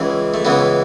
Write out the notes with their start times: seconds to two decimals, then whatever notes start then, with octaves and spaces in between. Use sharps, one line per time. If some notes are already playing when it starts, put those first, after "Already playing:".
Already playing: C#2 C#3 E3 G#4
0.34 A3
0.45 C#2 C#3 E3 B3